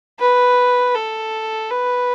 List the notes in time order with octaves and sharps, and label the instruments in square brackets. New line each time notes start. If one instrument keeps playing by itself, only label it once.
[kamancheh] B4
A4
B4